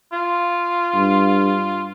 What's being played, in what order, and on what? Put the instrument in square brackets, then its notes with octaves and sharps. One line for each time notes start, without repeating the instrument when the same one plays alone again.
[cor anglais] F4
[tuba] G2